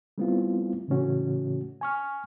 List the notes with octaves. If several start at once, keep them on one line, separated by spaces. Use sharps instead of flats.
G3 A3 B3 C4 E4 F4
A2 C#3 E3 A3 C#4 F#4
G#5 C#6 F6